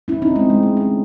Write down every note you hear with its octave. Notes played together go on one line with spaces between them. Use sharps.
C#4 E4
C4 D#4
G#3 C4
G#3
A3
A3 C#4